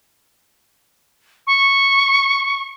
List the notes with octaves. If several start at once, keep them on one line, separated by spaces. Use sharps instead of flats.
C#6